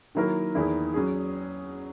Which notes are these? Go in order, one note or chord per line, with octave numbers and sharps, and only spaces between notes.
D#3 F#3 A#3 E4 A#4
E2 D#3 A#3 E4 G#4
F#3 C#4 G#4